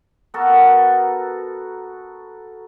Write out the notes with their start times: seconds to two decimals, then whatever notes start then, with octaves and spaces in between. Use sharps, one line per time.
0.34 B3 F#4 A4 A#4